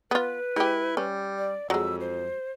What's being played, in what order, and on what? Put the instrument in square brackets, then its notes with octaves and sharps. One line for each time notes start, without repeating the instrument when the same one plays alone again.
[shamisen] B3 F4 [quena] B4
[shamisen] G#3 G4 [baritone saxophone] E4
[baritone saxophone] G3 [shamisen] C#4
[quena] D5
[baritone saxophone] F2 [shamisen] F#3 G#3 [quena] E6
[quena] C5